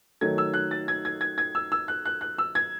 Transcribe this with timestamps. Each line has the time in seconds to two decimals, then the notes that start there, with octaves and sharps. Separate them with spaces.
0.21 D#3 F#3 A3 G#6
0.38 E6
0.54 F#6
0.71 A6
0.88 G#6
1.05 G#6
1.21 G#6
1.38 G#6
1.55 E6
1.72 E6
1.88 F#6
2.05 F#6
2.21 F#6
2.38 E6
2.55 G#6